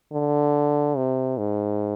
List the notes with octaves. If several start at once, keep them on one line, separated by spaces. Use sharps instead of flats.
D3
C3
G#2